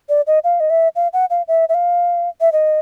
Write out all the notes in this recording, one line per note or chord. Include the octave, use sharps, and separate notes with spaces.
D5
D#5
F5
D#5
E5
F5
F#5
F5
E5
E5
F5
E5
D#5